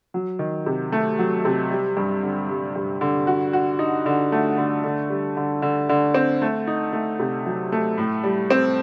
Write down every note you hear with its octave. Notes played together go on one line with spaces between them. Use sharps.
F#3
D#3
C3
A3
F#3
C3
G3
G2
D3
G3
G2
D3
F#4
F#4
D#4
D3
A3
D3
D3
G3
D3
D3
D3
C4
A3
D#4
A3
C3
F#3
A3
A2
G3
C4